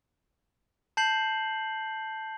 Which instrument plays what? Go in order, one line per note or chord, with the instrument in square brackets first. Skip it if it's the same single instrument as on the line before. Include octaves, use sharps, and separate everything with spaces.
[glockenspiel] A5 G6 C7 F#7